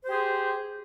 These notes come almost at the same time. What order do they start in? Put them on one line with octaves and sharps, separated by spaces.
C5 G4 G#4